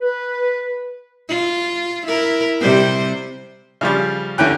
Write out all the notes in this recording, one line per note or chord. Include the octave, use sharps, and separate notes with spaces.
B4
F4
E4 A#4
C3 G3 C5
C#3 F3 G3
D#2 D3 E3 C#4 G5 F#6